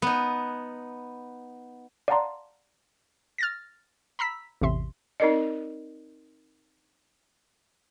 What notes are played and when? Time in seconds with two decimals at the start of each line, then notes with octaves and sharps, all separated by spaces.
0.02 B3 D#4
2.08 D5 F5 F#5 A5 A#5 C6
3.38 F6 A6 A#6
4.19 A#5 B5 E6 B6
4.61 A1 E2 C3 E5 C6
5.20 C4 D#4 A#4 D5 D#5